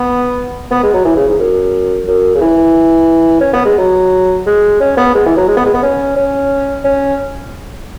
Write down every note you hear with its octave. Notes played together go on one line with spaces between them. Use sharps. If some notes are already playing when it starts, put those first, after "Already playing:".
Already playing: B3
B3
G#3
F#3
E3
C#3
G#2
F#2
F#2
C#3
E3
C#4
B3
G#3
F#3
G#3
C#4
B3
G#3
E3
F#3
G#3
B3
G#3
B3
C#4
C#4
C#4